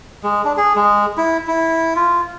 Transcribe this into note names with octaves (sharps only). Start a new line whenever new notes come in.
G#3
D4
G#4
G#3
E4
E4
F4